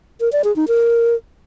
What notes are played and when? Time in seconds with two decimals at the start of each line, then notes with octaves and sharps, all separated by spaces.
0.21 A#4
0.32 D5
0.44 G#4
0.56 D#4
0.68 A#4